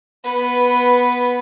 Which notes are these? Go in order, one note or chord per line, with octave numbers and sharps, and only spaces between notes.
B3 B4